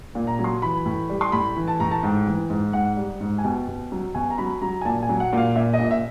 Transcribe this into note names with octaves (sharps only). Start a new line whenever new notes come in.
A#2
A#5
F#3
C6
E3 B5
A2
G3
C6
A2 B5
E3
A5
A2 A#5
A5
G#2 G5
E3
G#2
G#2 F#5
G3
G#2
G#5
B2 G5
B2
F#3
B2 G#5
A#5
F#3 B5
F#3 A#5
G#5
A#2 A5
G#5
F#3
F#5
A#2 F5
A#2 E5
D#5
A#2
E5